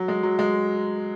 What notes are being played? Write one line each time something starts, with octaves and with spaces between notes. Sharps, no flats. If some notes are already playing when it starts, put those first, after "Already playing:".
Already playing: F#3
G#3
F#3
G#3